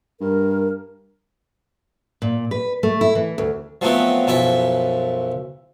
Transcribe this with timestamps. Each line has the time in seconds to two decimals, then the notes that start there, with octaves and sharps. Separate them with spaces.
0.20 G2 A#4
2.22 A#2
2.51 B4
2.83 A3
3.01 E4
3.15 E3
3.38 D2
3.81 F3 F#3 A3 B3 C4
4.27 B1 F#2 F3 E4 B5 C#6